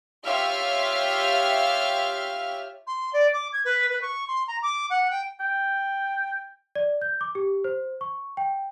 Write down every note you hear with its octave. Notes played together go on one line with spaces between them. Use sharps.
F4 G4 C#5 E5 F5 F6
C6
D5
D6
G#6
B4
B4
C#6
C6
A#5
D6
F#5
G5
G5
D5
G6
D6
G4
C5
C#6
G5